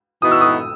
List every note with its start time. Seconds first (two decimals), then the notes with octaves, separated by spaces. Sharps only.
0.22 E3 B3 D#4 F#4 D#6
0.32 E6
0.41 D#6